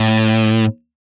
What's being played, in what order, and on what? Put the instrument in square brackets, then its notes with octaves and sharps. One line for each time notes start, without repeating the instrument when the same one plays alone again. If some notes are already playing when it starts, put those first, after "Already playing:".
Already playing: [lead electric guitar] A2